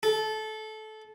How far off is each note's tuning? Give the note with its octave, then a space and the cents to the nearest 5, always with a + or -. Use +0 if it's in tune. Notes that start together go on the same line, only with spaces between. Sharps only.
A4 -20